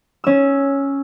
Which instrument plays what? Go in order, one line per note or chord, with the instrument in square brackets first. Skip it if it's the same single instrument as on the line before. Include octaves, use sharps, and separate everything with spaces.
[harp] C#4 E6